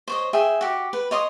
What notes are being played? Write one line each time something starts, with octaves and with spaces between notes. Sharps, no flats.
C5 C#5 D#5
G#4 E5 G5
F#4 G4
B4
C#5 D#5 C6 D#6